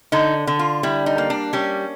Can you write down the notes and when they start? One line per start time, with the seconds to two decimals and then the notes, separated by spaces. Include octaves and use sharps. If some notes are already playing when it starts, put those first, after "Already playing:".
0.12 D3 D#4
0.47 D3
0.59 F4
0.83 G3 E4
1.06 D#4
1.18 A#3
1.30 D4
1.53 G3 C#4